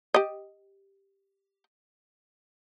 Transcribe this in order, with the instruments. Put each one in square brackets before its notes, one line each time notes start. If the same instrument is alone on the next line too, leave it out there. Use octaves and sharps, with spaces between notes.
[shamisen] G4 D#5